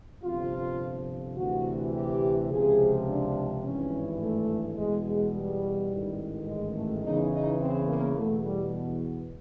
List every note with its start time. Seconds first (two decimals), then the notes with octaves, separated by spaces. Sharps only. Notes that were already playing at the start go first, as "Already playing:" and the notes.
0.24 G1 F2 C3 F3 F4
1.37 D2 C3 E3 F#4
1.94 G4
2.50 C#2 C3 F3 G#4
3.07 D4
3.63 G#1 G2 E3 C#4
4.20 A3
4.77 E2 B2 G#3
5.05 G#3
5.33 G3
5.90 A1 G#2 D#3
6.47 G#3
6.75 A3
7.03 E2 C#3 E3 D#4
7.32 D#4
7.60 C4
7.88 A#3
8.16 E2 B2 A3
8.45 G3